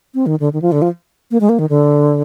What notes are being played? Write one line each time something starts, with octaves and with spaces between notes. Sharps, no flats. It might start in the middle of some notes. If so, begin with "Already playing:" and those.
C4
D#3
D3
D#3
F3
D3
F3
A#3
G#3
A#3
D#3
D3